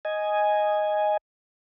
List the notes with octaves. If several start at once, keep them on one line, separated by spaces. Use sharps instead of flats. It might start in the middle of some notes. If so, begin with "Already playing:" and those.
D#5 G#5